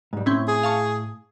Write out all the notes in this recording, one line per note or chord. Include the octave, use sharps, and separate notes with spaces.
G#2 G3
A2 C4 C#4 E4
G#4
F5 A5 C#6